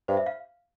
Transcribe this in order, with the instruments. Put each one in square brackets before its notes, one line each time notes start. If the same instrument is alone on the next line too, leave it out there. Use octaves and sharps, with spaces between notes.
[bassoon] G2 [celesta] C5
[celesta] E5
F5